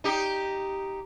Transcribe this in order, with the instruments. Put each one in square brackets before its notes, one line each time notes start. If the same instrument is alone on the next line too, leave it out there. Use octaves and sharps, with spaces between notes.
[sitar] D#4 G4